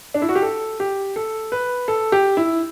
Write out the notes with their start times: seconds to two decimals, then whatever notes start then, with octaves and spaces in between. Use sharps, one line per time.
0.14 D4
0.22 E4
0.29 F#4
0.35 G4
0.42 A4
0.80 G4
1.16 A4
1.52 B4
1.88 A4
2.12 G4
2.37 E4